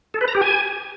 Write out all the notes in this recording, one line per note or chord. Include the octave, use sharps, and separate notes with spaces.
A4
B4
A#5
G4
G#5